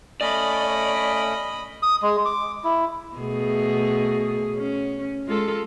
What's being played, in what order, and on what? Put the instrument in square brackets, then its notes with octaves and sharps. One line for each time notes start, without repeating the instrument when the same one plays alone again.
[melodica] A3 C#4 [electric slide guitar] D5 [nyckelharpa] D#5 B5
[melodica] D#6
G#3
D6
E4
[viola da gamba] B2 A3 G#4
C#4
G#3 F4 A4